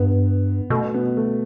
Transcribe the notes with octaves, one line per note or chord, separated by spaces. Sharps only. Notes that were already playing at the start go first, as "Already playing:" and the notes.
Already playing: G2 B3
B2 A3
B3
A3